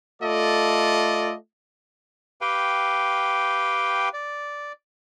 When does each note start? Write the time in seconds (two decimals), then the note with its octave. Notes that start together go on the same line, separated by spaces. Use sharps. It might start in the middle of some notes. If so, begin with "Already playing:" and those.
0.21 A3 F4 A4 D5 D#5
2.41 G4 B4 F5 G5
4.13 D5